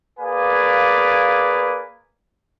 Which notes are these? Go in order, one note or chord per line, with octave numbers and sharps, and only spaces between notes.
A#3 G#4 B4 D5 F5 G#5